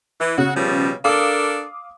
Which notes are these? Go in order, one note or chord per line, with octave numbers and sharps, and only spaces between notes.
E3
C#3 F#4
B2 F3 G3
D4 A4 A#4 F5 D6 D#6